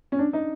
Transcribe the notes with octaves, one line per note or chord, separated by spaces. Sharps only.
C#4
D4
D#4